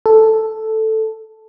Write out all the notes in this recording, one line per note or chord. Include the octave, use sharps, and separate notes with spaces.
A4